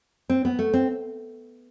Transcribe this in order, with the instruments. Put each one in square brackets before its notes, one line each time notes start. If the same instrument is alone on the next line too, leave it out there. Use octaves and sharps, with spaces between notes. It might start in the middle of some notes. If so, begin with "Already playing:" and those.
[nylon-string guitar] C4
B3
A3
C4